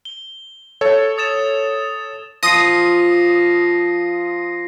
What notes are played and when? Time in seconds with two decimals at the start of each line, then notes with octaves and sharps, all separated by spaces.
0.05 G7
0.81 A4 C#5
1.18 D#6 A6 E7
2.43 F3 D#6 A#6 C7